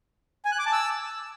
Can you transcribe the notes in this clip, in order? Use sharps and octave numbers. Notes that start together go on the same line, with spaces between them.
G#5
F#6
D6
A5
E6